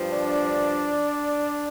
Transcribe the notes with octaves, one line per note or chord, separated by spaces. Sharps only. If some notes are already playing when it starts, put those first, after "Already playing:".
Already playing: G2 F3
D4 D5